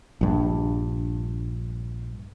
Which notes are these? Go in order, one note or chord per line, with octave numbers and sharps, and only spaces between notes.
A#1 G2